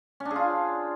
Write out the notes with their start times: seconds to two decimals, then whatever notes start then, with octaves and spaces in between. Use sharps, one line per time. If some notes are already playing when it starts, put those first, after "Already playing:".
0.20 C#4
0.25 D4
0.31 G#4
0.36 F4